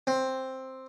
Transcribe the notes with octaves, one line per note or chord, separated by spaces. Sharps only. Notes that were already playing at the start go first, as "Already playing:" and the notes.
C4